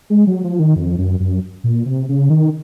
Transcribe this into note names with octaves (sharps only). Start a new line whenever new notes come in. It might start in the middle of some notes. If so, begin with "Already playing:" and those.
G#3
F#3
F3
D#3
F2
F#2
F#2
A#2
C3
C#3
D#3